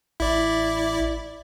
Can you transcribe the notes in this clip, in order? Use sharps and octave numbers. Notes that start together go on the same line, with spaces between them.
A1 E4 D5